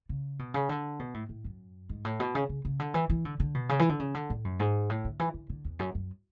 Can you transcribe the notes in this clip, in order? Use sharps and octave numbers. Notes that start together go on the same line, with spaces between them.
C#3
B2
C#3
D3
B2
A2
A2
F#2
G#2
A2
B2
C#3
C#3
C#3
D3
E3
E3
D3
D3
B2
C#3
E3
D3
C#3
D3
A2
F#2
G#2
A2
D3
E3
D3
D3
E2
F#2
F#2